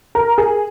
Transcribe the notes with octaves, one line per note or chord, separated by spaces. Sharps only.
A#4
G#4